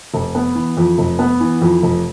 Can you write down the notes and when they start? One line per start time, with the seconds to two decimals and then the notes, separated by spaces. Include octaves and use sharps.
0.14 F1
0.35 B3
0.55 E3
0.77 F2
0.98 F1
1.19 B3
1.40 E3
1.61 F2
1.83 F1